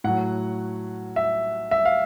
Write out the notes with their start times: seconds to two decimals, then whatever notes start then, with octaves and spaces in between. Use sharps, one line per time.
0.04 A2 F#3 F#5
1.16 E5
1.71 E5
1.85 F5